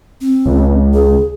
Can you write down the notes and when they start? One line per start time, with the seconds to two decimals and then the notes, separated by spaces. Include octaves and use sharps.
0.21 C4
0.46 C#2
0.94 G#4